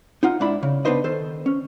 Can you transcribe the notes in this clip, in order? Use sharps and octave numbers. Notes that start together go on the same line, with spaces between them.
D#4 F4 F#5
G#2 D4 E4 B5
C#3
B3 D4 D#4 B4 C5 D#5
D#3 A4 C5
C#4